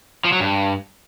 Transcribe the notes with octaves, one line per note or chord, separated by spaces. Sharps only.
F3
F#3
G2